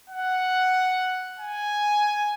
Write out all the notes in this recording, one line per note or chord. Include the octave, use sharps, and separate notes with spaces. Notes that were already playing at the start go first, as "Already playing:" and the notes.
F#5
G#5